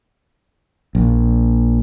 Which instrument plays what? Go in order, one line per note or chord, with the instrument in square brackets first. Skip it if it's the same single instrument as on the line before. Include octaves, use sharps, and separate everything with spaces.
[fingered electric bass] A#1